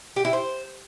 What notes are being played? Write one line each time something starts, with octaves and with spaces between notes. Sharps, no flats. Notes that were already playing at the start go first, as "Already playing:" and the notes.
G4
E4
C5